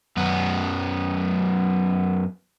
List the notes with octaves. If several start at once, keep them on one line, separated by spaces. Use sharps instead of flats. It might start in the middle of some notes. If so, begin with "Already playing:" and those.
F#2 B3